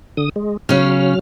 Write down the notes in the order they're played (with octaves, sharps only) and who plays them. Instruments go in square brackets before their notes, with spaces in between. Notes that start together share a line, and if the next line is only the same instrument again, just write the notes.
[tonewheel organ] D3 D#6
G#3
[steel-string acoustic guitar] C#3 C#4 [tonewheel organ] F#3 F6